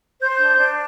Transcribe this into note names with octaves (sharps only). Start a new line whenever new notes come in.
C5 G6
D4 G6
D4